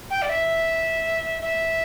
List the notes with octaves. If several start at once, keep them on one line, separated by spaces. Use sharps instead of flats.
G5
D5
E5
E5